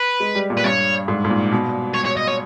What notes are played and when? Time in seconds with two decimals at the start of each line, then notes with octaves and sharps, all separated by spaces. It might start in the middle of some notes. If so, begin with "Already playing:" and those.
Already playing: B4
0.20 G#3
0.35 G3
0.50 A#2
0.57 B4
0.64 G2 C#5
1.08 G#2
1.24 G#2
1.30 A#2
1.52 B2
1.94 C#5
2.05 C#5
2.17 D#5
2.28 C#5